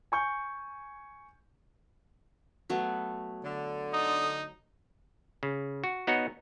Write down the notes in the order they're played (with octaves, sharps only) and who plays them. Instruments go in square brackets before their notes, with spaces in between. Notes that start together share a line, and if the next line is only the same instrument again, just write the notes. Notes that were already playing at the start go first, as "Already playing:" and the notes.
[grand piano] G#5 C#6 G6
[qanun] F#3 A3 B3
[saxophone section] D3
[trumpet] D#4 [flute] D#6
[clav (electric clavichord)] C#3
F#4
B3 D#4 F#4 C#5